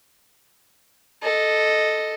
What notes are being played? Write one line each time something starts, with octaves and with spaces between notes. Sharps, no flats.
A4 D#5